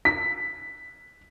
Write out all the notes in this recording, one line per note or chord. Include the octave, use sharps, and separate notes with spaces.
B6